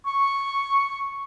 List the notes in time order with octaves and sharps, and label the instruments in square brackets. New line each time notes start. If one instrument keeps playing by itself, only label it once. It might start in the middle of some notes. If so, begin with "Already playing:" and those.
[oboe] C#6